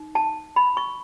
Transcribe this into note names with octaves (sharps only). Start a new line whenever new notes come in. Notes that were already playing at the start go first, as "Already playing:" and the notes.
Already playing: D#4
A5
B5
C#6